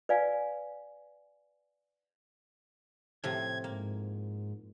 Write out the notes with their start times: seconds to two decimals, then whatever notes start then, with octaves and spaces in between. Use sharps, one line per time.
0.09 B4 D5 F5 G#5
3.24 A2 C3 F3 G#6
3.64 G#2 A#3